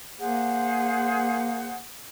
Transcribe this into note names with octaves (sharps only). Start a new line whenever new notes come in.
A#3 G#4 C5 F#5